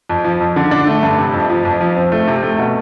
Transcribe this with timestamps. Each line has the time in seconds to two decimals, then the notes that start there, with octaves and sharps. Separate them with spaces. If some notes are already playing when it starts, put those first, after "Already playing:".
0.09 F2
0.24 F3
0.40 F2
0.56 D3
0.71 D4
0.87 A3
1.03 G2
1.18 C3
1.34 F2
1.50 F3
1.65 F2
1.80 F3
1.96 C4
2.12 A3
2.28 C3
2.43 A3
2.59 B2